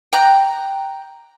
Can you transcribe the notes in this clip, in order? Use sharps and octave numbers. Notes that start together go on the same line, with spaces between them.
G5 A#5 F#6